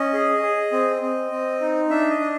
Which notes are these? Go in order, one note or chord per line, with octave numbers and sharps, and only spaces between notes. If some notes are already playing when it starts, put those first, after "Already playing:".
Already playing: C#4 D#5
G#4
G#4
C4
C4
C4
D#4
D4 E5
D#5
D4